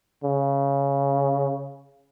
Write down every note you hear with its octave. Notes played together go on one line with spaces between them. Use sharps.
C#3